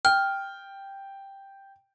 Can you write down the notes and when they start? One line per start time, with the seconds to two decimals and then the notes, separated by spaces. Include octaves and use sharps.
0.05 G5 F6